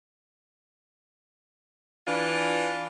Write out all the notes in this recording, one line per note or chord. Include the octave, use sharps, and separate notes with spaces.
E3 D4 F4